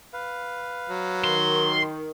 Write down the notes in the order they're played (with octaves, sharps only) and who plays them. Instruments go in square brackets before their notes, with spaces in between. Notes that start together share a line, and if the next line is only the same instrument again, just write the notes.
[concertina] B4 F5
[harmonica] F#3
[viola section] D#3 [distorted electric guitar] C6